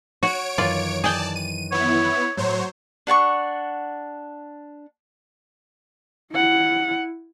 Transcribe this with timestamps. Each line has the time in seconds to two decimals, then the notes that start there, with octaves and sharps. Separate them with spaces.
0.23 F#4 C#5 D7
0.58 F#2 D#3 E3 F4 D5
1.04 G#4 D5 G5 A5
1.35 D#7
1.72 B3 E4 C#5
2.37 A2 F#3 C5 C#5
3.07 D4 F#5 A5 C#6
6.32 E4 F#5